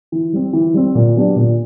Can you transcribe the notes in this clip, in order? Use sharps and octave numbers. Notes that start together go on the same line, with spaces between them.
E3
G3 C4
E3
G3 C4
A#2
F#3 B3 D4 G4
A#2